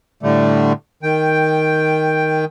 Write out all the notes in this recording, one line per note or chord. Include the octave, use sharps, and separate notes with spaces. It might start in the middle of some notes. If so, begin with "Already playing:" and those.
A2 D3 G3 A3
D#3 G5